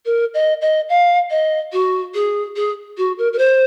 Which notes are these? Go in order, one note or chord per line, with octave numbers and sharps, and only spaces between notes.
A#4
D#5
D#5
F5
D#5
F#4
G#4
G#4
F#4
A#4
A#4
C5